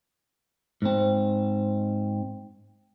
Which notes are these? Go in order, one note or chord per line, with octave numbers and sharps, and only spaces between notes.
G#2 C4